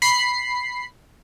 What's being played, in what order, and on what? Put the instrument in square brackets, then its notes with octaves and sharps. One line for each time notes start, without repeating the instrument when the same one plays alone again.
[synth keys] B5 C7